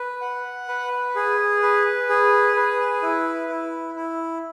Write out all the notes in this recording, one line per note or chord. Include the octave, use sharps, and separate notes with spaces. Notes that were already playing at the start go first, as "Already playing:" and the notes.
Already playing: B4
F#5
B4
G#4
B4
G#4
B4
E4
E4
E4